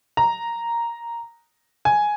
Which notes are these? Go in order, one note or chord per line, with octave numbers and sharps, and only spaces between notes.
A#5
G#5